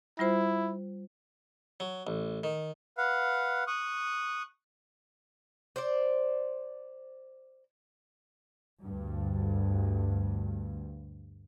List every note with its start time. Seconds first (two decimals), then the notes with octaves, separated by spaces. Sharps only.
0.19 G3 E4 F4 C5
1.80 F#3
2.07 A1
2.44 D#3
2.98 B4 F5 F#5
3.67 C#6 D#6 F#6
5.76 C5 D5
8.85 D2 G2